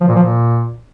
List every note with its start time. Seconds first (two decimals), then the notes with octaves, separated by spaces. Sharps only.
0.01 F3
0.08 A#2
0.15 F3
0.23 A#2